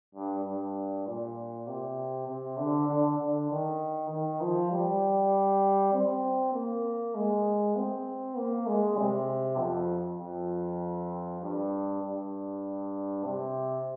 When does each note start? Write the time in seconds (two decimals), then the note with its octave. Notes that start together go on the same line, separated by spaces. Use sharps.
0.15 G2
0.45 G2
1.06 A#2
1.67 C3
2.28 C3
2.58 D3
2.88 D3
3.19 D3
3.50 D#3
4.10 D#3
4.41 F3
4.72 G3
5.93 C4
6.54 A#3
7.15 G#3
7.76 C4
8.37 A#3
8.67 G#3
8.97 C3
9.59 F2
10.20 F2
11.41 G2
12.02 G2
13.24 C3